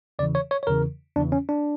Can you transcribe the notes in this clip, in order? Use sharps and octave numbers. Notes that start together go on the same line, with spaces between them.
E2 C#3 E3 D5
C#5
C#5
C#5
E2 C#3 E3 A#4
E2 C#3 E3 D4
C#4
D4